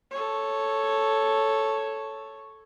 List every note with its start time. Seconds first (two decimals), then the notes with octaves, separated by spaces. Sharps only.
0.11 A4 C#5